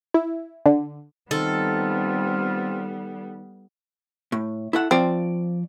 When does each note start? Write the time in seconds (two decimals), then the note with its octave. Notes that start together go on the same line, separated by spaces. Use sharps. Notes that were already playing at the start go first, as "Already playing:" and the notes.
0.14 E4
0.66 D3
1.31 D#3 G3 B3 C4 F4 A4
4.32 A2
4.73 E4 A4 F#5
4.91 F3 C4 F4 D5